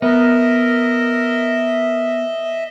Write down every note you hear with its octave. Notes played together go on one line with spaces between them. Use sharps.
B3 A#4 D#5 E5